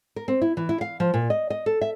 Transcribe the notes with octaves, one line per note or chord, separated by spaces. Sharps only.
A#4
C4
E4
E3
E4
F5
F3
A#2
D#5
D#5
A4
E5